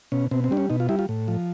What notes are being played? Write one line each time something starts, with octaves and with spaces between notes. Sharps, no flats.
B2 C#4
B2 C4
C4
G3 D4
C#4
B2 D#4
F4
G3 E4
F4
A2
F3